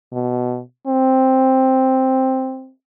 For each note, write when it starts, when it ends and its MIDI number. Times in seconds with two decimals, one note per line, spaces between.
0.13 0.60 47
0.87 2.71 60